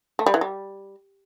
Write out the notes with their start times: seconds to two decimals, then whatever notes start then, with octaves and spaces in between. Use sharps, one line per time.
0.19 A3
0.26 G3
0.34 E3
0.41 G3